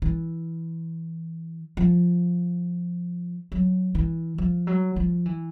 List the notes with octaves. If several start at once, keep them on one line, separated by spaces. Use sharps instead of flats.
E3
F3
F#3
E3
F3
F#3
F3
E3